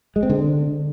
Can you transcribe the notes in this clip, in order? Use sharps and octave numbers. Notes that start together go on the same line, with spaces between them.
G#3
C4
D3